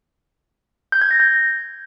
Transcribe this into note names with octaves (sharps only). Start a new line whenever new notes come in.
G6
G#6
A#6
G6